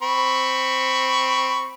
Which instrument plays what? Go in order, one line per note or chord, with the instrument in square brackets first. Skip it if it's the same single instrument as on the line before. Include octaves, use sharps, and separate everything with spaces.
[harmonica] C4 B5 C#6